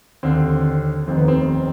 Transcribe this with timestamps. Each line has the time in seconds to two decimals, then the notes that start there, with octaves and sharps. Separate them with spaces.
0.23 D#2 D3 C4
1.08 F1 D#2 D#3 C4
1.17 B3
1.28 C4